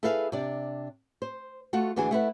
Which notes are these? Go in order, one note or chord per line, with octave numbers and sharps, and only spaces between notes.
E4 G#4 A4 B4 E5 F5
C3 D4 D5
C5
A3 F4 F#4 F#5
D2 E3 D4 F#4 G#4 G#5
A3 E4 B4 F#5